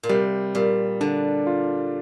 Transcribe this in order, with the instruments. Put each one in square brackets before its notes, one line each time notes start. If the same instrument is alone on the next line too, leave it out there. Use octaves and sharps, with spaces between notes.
[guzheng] A#2
[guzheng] C3 [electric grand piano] G3
[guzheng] A#2 [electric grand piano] G3
[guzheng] D3 [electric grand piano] D4
[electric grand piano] F4